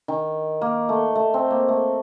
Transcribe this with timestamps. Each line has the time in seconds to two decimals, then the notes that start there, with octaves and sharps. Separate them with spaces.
0.08 D#3
0.61 A#3
0.89 A3
1.16 A3
1.34 C4
1.51 A#3
1.68 A3